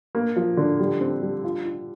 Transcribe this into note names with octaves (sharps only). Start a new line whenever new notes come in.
A#3
F3
D3
G3
C4
G3
F4
F4